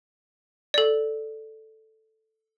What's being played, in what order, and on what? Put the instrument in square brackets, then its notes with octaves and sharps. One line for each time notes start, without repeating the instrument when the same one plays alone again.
[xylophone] A4 D5